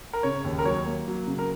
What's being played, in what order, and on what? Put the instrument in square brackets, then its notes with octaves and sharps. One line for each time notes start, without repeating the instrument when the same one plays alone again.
[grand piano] A#4
C#3 C#5
D#2
A#4
F#3 C#5
A#3
F#3
C#3
A#4